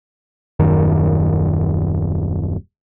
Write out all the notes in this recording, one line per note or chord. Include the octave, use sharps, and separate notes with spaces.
D#1 F#2 D#3